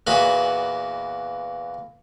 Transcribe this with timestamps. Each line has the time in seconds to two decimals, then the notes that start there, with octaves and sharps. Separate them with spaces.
0.07 E2 A#2 B3 F#4 G#5 B5